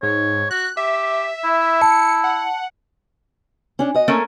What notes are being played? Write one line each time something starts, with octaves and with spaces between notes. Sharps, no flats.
G#2 C#5
F#4 F#6
G4 E5
E4
A5 C#7
F#5
C#4 D4
F#4 D#5
A3 A#3 C#4 A#4